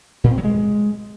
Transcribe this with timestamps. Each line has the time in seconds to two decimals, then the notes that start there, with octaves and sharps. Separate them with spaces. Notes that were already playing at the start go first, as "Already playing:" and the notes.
0.24 A#2
0.31 C4
0.38 F#3
0.44 G#3